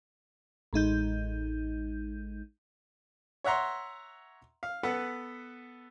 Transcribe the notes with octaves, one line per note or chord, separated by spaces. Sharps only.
A1 G#3 D#4 G6
C#5 E5 F#5 A#5 C6
F5
B3 A4 B4 F#5